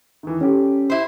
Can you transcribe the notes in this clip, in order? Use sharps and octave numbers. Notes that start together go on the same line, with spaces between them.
D#3 E3
G3 C#4 G4 A4
E4 C5